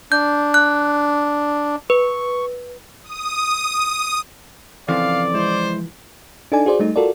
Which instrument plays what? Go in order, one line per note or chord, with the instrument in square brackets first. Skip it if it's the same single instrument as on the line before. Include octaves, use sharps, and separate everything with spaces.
[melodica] D4 [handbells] G6
[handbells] F#6
[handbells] B4 [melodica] C#6
[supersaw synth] D#6
[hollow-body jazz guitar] C#3 E3 F3 [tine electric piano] C4 A4 [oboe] D5 [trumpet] F5
[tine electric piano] G#3 E4 [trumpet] C5
[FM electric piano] D4 D#4 A4 D5 G#5
F#4 G#4 C5 D5
G3 A3 D#4
F4 F#4 A4 A#4 D5